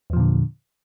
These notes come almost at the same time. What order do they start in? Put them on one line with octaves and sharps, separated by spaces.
E2 F3 A#2 D3